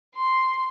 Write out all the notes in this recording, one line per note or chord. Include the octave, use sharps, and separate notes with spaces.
C6